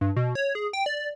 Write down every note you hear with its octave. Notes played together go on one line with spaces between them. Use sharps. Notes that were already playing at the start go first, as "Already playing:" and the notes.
G2
B2
C#5
G#4
G5
D5